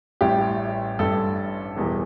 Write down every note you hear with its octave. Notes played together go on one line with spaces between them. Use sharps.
A1 A2 G3 G4
A1 G2 G3 A4
E1 E2 E3 G3